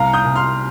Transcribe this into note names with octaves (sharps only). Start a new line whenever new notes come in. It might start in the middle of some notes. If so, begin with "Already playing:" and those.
Already playing: C2 F5 A#5
D#6 G6
C2
C6 F6